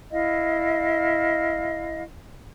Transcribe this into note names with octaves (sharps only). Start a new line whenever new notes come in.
E4 D#5 F5